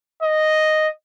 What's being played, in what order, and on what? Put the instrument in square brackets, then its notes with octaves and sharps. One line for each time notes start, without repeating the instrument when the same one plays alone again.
[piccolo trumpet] D#5